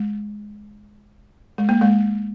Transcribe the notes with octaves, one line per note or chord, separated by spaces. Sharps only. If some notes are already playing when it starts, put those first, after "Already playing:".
Already playing: G#3
G#3
A#3
G#3